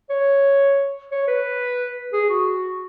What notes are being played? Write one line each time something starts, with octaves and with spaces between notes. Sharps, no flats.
C#5
C#5
B4
G#4
F#4